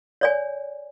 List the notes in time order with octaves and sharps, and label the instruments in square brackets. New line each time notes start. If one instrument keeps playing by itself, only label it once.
[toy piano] C#5 D5 G#5